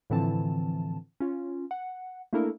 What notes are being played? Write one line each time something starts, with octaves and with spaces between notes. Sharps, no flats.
A2 D3 E3 F3 C4 A5
C#4 F4
F#5
A3 A#3 D4 E4 A4 A#4